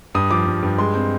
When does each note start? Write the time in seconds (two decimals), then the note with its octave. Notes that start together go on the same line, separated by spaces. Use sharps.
0.15 G2 D#6
0.31 F3 D6
0.47 G2
0.63 G2
0.78 G#3 C6
0.94 C4